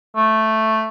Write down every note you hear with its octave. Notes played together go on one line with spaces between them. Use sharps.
A3